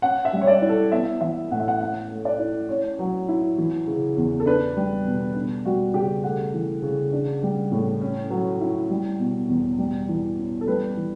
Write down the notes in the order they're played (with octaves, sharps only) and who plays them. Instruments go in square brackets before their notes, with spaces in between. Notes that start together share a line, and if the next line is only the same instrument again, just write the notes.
[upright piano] C#4 F#5
E5
G3
C#5
D5
E4
A4
B3 E5
E3 E5
A2 F#5
E5
F#5
C#4 F#5
A3
D5
E4
C#4 C#5
F#3
E4
E3
C#3
E2
A4
D4 B4
G3
B2
D4
G3 F#4
C#3 G4
A3 F#5
E3
C#3
D4
G3
A2
C#4
F#3
E4
G3
B2
E2
G3
E3
C#4
A4
G3 B4
E3